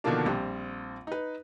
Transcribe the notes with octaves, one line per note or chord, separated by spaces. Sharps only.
B2 D3 D#3 F3 A#3 D4
A#1 G3 C4
D#4 B4